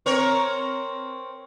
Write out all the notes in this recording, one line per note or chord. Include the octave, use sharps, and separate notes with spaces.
C4 A#4 C#5